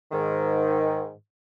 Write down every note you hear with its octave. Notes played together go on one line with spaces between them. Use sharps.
G#2 D#3